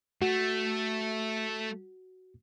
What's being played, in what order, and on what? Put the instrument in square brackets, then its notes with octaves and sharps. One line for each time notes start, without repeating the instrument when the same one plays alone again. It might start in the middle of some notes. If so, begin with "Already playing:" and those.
[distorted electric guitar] A3 [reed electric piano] F#4